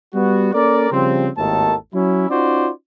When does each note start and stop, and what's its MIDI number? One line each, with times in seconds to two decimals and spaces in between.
0.15 0.50 55
0.15 0.50 59
0.15 0.50 66
0.54 0.91 58
0.54 0.91 61
0.54 0.91 69
0.54 0.91 70
0.54 0.91 74
0.92 1.29 49
0.92 1.29 53
0.92 1.29 55
0.92 1.29 60
1.37 1.75 32
1.37 1.75 39
1.37 1.75 45
1.37 1.75 51
1.37 1.75 69
1.37 1.75 81
1.94 2.29 54
1.94 2.29 61
1.94 2.29 64
2.30 2.70 61
2.30 2.70 63
2.30 2.70 65
2.30 2.70 66
2.30 2.70 72
2.30 2.70 74